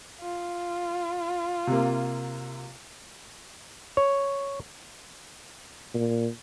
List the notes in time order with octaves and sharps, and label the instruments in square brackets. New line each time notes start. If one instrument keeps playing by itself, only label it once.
[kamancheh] F4
[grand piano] C3 A#3
[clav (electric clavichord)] C#5
[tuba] A#2